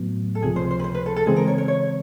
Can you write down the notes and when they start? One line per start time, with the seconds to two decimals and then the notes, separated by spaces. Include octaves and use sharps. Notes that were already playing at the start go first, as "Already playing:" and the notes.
Already playing: A2 F#3 B3
0.35 A4
0.42 C#2 C3 F3 G#4
0.56 C5
0.71 C5
0.80 B4
0.84 C5
0.95 B4
1.06 A4
1.16 A4
1.26 C#3 E3 G#3 C4 G#4
1.36 A#4
1.47 C#5
1.58 C#5
1.68 C#5